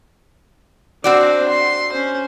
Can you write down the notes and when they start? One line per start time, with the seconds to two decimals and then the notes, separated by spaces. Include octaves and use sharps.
1.04 C4 D4 F#4 C5 D5
1.49 C6
1.92 C#4 C5